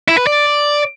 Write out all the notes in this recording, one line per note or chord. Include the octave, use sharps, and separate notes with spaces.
E4
B4
D5